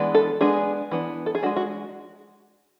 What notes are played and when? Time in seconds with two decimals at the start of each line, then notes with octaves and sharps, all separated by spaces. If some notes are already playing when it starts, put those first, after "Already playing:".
Already playing: E3 G#3 B3 D4
0.15 A4
0.41 G#3 B3 D4 G#4
0.91 E3 B3 D4
1.26 A4
1.35 G#4
1.43 D4 F#4
1.46 G#3
1.56 F#4